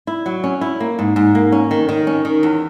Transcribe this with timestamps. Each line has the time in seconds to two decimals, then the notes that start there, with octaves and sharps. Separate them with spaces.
0.07 E4
0.26 F#3
0.44 C#4
0.61 E4
0.80 A#3
0.99 G#2
1.16 G#2
1.35 A#3
1.52 C#4
1.71 D#3
1.89 D#3
2.07 C#4
2.25 D#3
2.43 E2